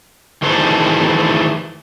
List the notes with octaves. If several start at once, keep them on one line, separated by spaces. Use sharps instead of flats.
D#3 E3 G#3 A3 C5